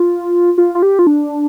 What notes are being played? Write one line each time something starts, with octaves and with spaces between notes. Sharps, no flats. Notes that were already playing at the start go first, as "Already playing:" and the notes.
Already playing: F4
F4
F4
G4
F4
D4